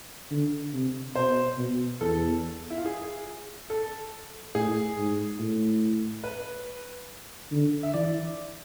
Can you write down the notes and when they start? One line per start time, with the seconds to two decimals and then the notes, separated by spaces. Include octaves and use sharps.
0.31 D3
0.73 C3
1.16 B2 C5
1.58 B2
2.01 E2 A4
2.70 E4
2.77 F4
2.86 G#4
3.70 A4
4.55 A2 G#4
4.97 G#2
5.39 A2
6.24 B4
7.51 D3
7.83 E5
7.94 E3 D5